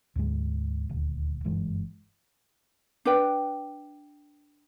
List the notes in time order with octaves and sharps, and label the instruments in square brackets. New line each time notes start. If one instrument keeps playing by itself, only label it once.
[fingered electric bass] D2 G#2 G#3
D#1 D2
F#1 G2 E3 G#3
[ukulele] D4 B4 G5